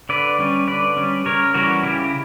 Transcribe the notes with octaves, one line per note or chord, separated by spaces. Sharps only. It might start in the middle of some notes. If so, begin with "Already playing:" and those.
D3 B4 D5
G3 C#4
D3 B4 D5
G3 C#4
C#3 A#4 C#5
E3 G3 C#4 F#4 A#4
C#3 E4 G4